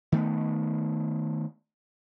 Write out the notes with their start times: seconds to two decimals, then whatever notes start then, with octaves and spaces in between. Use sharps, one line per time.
0.12 D#3 A3 B3